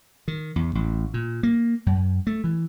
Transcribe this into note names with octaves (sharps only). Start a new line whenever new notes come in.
D#3
E2
A1
A#2
A#3
F#2
A3
E3